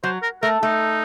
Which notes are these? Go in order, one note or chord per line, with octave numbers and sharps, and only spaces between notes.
F#3 C5
A#4
A3 A#4
A3 D#4